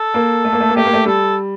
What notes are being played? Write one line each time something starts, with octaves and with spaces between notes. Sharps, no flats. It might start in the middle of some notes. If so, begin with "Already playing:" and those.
Already playing: A4
A#3
A3
A#3
A3
A#3
A3 G4
A#3
A3
G3 A4